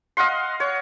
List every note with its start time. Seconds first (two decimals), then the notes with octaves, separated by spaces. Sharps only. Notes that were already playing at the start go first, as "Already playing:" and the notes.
0.17 D#5 F5 F#5 C6
0.60 C#5